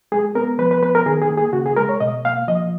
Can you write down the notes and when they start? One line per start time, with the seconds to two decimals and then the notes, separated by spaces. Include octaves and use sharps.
0.12 G#3 G#4
0.35 B3 A#4
0.58 F3 B4
0.71 B4
0.83 B3 B4
0.95 A#4
1.06 D#3 G#4
1.22 G#4
1.30 A#3
1.37 G#4
1.53 C#3 F#4
1.66 G#4
1.77 G#3 A#4
1.89 C#5
2.00 B2 D#5
2.25 A#3 F5
2.48 F3 D#5